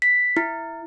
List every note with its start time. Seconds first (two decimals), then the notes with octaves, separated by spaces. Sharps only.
0.02 B6
0.37 E4